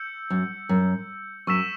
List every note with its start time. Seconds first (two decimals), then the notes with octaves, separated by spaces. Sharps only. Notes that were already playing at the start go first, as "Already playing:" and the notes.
Already playing: E6 G6 C#7
0.30 F#2
0.69 F#2
1.47 F#2 C#6 E6 B6 E7